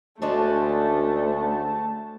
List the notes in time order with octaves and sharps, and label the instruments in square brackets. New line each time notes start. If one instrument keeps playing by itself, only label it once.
[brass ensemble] D2 [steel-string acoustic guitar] G#3 C#4 D4 [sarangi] A3 [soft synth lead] A5